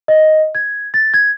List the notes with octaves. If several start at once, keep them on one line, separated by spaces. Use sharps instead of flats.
D#5
G#6
A6
G#6